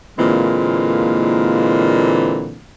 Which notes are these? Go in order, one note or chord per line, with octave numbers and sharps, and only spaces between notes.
A#2 D3 E3 G#3 A#3 C4